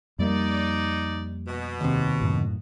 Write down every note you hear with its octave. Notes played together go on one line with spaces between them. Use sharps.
F2 G3 A#3 D#4 D5
B2
D#2 C3
F#2 A2